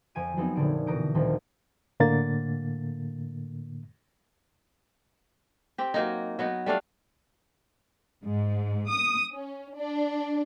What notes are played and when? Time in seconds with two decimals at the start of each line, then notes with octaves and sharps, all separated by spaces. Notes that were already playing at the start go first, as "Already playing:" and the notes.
0.15 F2 F3 G#5 D7 D#7
0.37 F3 F#3 B3 C4 D#4 G#4
0.56 F1 A#2 D3 D7
0.87 B2 E3 A#5 D#6 G6 D7
1.15 D2 A#2 D#3 F3 G3 C4
2.00 A2 D3 A#3 A6
5.78 C4 G4
5.94 F#3 A#3 D#4
6.39 F#3 B3 D#4
6.66 G3 A3 D4 F5
8.24 G#2
8.89 D#6
9.33 C#4
9.76 D4